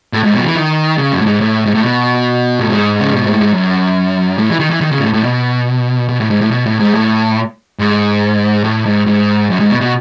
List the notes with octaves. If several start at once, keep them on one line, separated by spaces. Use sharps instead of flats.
A2
G#2
B2
F#3
E3
D#3
C#3
F#2
A2
G#2
A2
G#2
A2
B2
A2
G#2
C#3
B2
A2
G#2
F#2
A2
E3
D#3
E3
D#3
C#3
B2
A2
A2
B2
B2
A2
G#2
A2
B2
A2
G#2
A2
G#2
A2
G#2
G#2
F#2
G#2
B2
B2